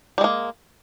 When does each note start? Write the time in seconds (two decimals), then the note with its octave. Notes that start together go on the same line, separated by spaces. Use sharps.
0.18 G3
0.21 G#3
0.24 A#3